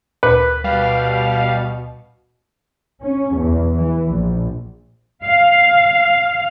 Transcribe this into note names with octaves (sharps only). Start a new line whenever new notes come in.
D2 A#2 B4 C5
B2 G3 F5
C#4
E2
E3
A#1
F5